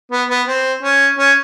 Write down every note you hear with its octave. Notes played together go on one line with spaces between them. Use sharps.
B3
B3
C4
C#4
C#4